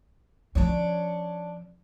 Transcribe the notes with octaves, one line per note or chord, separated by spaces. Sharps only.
F3 C#4 D4 C#5